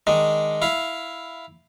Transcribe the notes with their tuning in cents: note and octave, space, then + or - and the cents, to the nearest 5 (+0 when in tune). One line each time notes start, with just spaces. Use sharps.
D#3 +0 G#3 +0 D4 +0
E4 +0 F5 +0